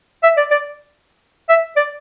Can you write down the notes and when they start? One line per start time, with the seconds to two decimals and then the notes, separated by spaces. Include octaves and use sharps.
0.23 E5
0.37 D5
0.51 D5
1.49 E5
1.76 D5